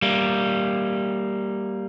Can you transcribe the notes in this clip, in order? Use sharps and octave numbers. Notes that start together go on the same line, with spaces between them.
G3 A#3